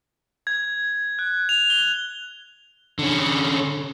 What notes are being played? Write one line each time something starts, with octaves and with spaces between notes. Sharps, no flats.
G#6
F#6
F7
G7
D3 C#4